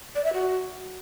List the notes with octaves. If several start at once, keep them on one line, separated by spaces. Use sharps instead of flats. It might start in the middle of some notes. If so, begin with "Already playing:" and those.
D5
E5
F#4